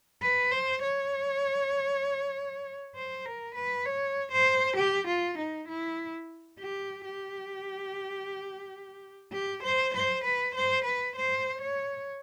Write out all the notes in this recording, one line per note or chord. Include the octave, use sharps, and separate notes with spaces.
B4
C5
C#5
C5
A#4
B4
C#5
C5
G4
F4
D#4
E4
G4
G4
G4
C5
C5
B4
C5
B4
C5
C#5